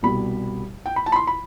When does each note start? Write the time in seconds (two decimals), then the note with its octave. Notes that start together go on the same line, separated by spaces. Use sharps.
0.03 C2 B2 G3 B5
0.86 G5
0.96 B5
1.06 A5
1.12 B5
1.16 C6
1.27 B5